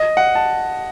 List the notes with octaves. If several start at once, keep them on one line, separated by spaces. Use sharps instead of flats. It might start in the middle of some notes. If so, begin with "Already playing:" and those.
Already playing: D#5
F#5
A5